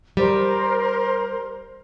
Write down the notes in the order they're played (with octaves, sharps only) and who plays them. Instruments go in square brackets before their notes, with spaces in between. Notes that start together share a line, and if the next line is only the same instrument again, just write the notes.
[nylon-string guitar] G3 [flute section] A#4 C5